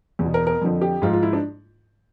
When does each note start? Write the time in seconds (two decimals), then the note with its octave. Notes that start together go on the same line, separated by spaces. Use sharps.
0.19 E2
0.24 B2
0.34 A#4
0.47 A#4
0.61 F2 D3 F3
0.81 G4
1.02 G#2 F3 F4
1.13 F4
1.23 E4
1.33 D4